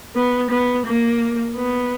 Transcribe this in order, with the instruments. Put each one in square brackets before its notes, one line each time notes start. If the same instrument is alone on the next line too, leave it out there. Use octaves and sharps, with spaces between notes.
[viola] B3
B3
A#3
B3